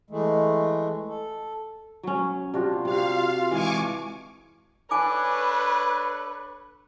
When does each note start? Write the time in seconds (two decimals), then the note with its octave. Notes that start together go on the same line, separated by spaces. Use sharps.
0.10 E3 G#3 A3
1.08 A4
2.03 F#3 C#4
2.54 C3 D4 F4 F#4
2.85 C3 F5
3.51 E3 G#3 G#5 C#6 D6
4.91 D4 A4 B4 C#5 G#5 D6